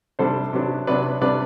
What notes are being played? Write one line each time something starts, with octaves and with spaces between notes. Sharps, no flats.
C3 G3 D4 A4 C5
C3 F#3 B3 D4
C3 F#3 B3 D4 B4 D5
C3 G3 D4 B4 D5